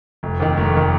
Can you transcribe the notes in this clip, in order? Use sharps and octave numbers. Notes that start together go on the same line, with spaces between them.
F1
D#2 D#3
F1
D#3